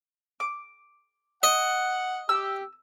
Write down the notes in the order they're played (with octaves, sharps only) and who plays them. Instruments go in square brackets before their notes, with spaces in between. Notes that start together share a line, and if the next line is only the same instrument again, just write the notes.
[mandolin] D6
[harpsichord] D#5 [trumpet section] F#5
[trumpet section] G4 [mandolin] E6